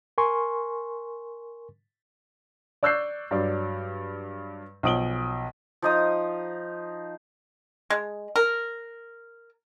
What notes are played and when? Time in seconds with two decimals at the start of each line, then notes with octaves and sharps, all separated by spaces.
0.18 A#4 G#5 C6 C#6
2.83 D5 C#6 E6 F#6 G6 C7
3.31 G2 F#3 D5
4.83 B1 F3 D#6 D7 F#7 G7
5.82 F3 D#4 D#6
7.90 G#3
8.36 A#4